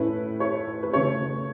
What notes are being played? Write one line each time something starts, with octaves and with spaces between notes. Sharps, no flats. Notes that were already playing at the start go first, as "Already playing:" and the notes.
Already playing: A2 A3 C#4 E4 B4
C#5
B4
C#3 A3 C#4 C#5